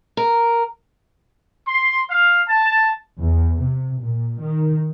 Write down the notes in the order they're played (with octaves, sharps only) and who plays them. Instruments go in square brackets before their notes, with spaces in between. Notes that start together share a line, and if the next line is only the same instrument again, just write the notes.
[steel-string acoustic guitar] A#4
[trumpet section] C6
F5
A5
[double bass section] E2
C3
A#2
D#3